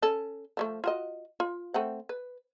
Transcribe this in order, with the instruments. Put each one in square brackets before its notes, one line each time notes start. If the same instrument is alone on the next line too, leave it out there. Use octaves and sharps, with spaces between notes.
[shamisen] C#4 A4
F3 G3 A3
F4 F#4 D#5
F4
A3 C4 F#5
B4